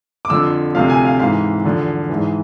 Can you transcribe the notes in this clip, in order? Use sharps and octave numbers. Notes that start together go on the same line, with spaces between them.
D6
F2 D3 F3 E6
D2 C3 F3 F5
G#5
F5
G#2 E3 F5
E2 D3 F3
G#2 E3